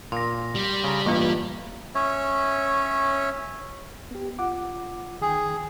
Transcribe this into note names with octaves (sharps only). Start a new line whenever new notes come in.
A#2 C6 A#6
G3
C#3 A#5
A1 G2 A#3 F4
C#4 C#5 E5
B3 G4
F4 F#5 D6
D#3 G#4 G5